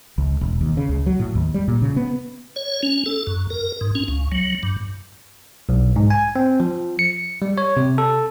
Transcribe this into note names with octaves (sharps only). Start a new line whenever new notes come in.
C#2
E1
D#2
C#3
C#2
F#3
A2
D#2
G3
A#2
C#3
B3
C#5
C#4
A4
F#2
A#4
G#2
C#4
C#2
F#3
G2
B1
G#2
G#5
C4
F3
C#7
G3
C#5
C3
A4